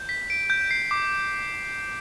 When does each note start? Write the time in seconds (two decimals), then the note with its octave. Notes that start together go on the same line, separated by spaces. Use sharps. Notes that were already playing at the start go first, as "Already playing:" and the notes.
Already playing: G6
0.09 B6
0.30 D7
0.50 G6
0.71 C7
0.91 D6